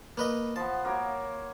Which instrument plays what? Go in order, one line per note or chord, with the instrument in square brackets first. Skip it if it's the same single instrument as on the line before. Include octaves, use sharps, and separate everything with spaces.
[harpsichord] A#3 B4 D#5
[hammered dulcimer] F3 B3 [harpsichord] A5
[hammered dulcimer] A#3 F#4 C#5